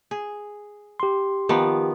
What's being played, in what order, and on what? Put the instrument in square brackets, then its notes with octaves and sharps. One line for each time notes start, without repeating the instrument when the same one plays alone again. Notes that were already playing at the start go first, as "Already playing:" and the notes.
[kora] G#4
[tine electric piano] G4 C6
[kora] D#3 F3 B3 [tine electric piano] G4